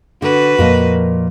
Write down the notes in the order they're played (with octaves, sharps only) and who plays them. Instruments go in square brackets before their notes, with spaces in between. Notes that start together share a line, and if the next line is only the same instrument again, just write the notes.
[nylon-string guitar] D3 [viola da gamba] F#4 B4
[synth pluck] F2 F3 [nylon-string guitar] A#2 A#4 D#5